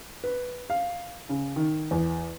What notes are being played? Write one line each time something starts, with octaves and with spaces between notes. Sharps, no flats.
B4
F5
C#3
D#3
E2